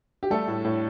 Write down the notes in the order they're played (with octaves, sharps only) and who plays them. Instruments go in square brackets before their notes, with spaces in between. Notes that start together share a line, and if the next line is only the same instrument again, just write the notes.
[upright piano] G4
G3 A3 A4
A2
A2